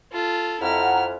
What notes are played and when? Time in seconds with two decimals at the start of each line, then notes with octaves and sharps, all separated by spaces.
0.12 F4 A4
0.61 F2 E4 F#5 A#5 F6